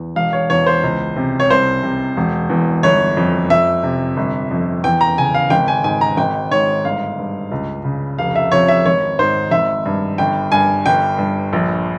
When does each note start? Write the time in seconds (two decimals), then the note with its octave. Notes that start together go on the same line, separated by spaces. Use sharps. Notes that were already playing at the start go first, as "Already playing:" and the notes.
Already playing: E2
0.16 E1 F5
0.33 C#5
0.50 E2 C#5
0.66 C5
0.84 C#2
1.16 C3
1.40 C#5
1.50 C2 C5
1.83 C3
2.17 E1
2.50 E2
2.83 G1 C#5
3.17 F2
3.50 F2 E5
3.83 C3
4.17 G1
4.51 F2
4.84 E2 G5
5.01 A#5
5.18 C#3 G#5
5.34 F5
5.50 G#1 G5
5.68 G#5
5.84 G#2 G#5
6.01 A#5
6.17 G#1 G5
6.51 G#2 C#5
6.85 G1 F5
7.19 G2
7.51 C#2
7.84 C#3
8.18 F1 F5
8.36 E5
8.52 F2 C#5
8.68 E5
8.85 G#1 C#5
9.19 G#2 C5
9.51 G#1 E5
9.86 G2
10.18 G1 G5
10.52 G2 G#5
10.86 G1 G5
11.18 G2
11.53 A#1